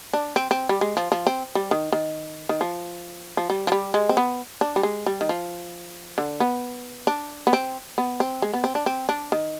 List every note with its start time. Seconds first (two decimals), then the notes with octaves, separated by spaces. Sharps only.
0.13 D4
0.36 C4
0.51 C4
0.69 G3
0.81 G#3
0.97 F3
1.12 F3
1.27 C4
1.55 G3
1.71 D#3
1.92 D#3
2.49 D#3
2.61 F3
3.37 F3
3.50 G3
3.67 F3
3.72 G3
3.94 G#3
4.09 C4
4.17 B3
4.61 D4
4.76 G3
4.83 G#3
5.06 G3
5.21 D#3
5.29 F3
6.18 D3
6.40 B3
7.07 D4
7.47 B3
7.53 C4
7.98 B3
8.20 C4
8.42 G#3
8.54 B3
8.64 C4
8.75 D4
8.86 C4
9.09 D4
9.32 D#3